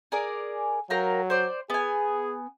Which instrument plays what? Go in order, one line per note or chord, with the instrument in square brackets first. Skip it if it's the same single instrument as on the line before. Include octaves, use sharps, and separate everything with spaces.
[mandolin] G#4 A#4 D5
[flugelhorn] F#3 [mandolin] A#4 F5 G5
[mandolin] C5 D5
[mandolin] B3 G#5 [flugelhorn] G#4